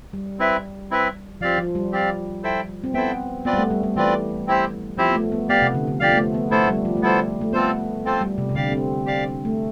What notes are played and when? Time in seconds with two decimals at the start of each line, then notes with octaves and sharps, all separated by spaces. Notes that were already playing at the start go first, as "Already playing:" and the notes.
0.13 G3
0.39 C4 E4 B4 E5
0.91 C4 E4 B4 E5
1.41 F3 C4 G4 D5 F5
1.58 F3
1.75 G3
1.92 C4 G4 D5 F5
2.43 E4 A4 C5 E5 G5
2.84 C4
2.94 B3 E4 A4 C5 E5 G5
3.45 B3 C4 F4 B4 D5
3.53 G3
3.58 A3
3.70 G3
3.83 G3
3.96 E3 C4 F4 B4 D5
4.47 C4 E4 G4 C5
4.98 F3 C4 E4 G4 C5
5.09 B3
5.15 A3
5.32 B3
5.49 B3 G4 D5 F5
5.62 C3
5.74 D3
5.88 D3
6.00 F3 G4 D5 F5
6.12 B3
6.17 A3
6.34 B3
6.51 A3 B3 E4 A4 C5
6.68 G3
6.85 F3
6.97 A3
7.02 G3 B3 E4 A4 C5
7.41 A3
7.53 B3 C4 F4 A4 C5
8.05 C4 F4 A4 C5
8.21 G3
8.38 C3
8.49 C3
8.55 D3 G4 D5 F5
8.72 C4
9.06 G4 D5 F5
9.45 A3